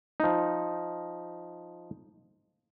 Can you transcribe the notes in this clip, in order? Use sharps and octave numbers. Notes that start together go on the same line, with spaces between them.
F3 D#4